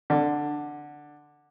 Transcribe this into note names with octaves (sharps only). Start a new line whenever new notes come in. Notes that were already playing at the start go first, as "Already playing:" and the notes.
D3